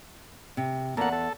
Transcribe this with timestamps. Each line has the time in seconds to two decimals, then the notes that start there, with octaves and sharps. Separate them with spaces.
0.57 C3
0.97 E2 A#3 A4 F#5
1.12 A4